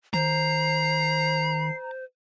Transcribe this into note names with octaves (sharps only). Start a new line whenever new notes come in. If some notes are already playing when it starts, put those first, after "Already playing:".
D#3 C5 A#5 C7